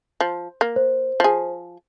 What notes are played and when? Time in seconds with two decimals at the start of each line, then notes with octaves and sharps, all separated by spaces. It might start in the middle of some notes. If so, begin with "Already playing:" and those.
0.21 F3
0.61 A#3
0.76 C5
1.20 F3 G#4